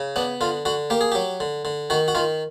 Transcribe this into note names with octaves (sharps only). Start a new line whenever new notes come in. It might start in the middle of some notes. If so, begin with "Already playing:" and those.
Already playing: C#3
B3 D4
D3 F4
D3 F#4
A#3 G4
G#4
F#3 G4
D3
D3
D#3 F#4
F#4
D#3 F4